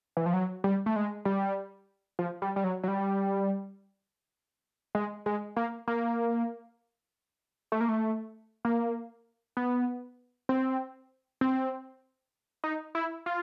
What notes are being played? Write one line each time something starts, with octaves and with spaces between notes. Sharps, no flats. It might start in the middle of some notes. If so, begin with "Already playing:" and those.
E3
F3
F#3
G3
A3
G#3
G3
F3
G3
G3
F#3
F#3
G3
G#3
G#3
A#3
A#3
A3
A#3
A3
A#3
B3
C4
C4
D#4
E4
F4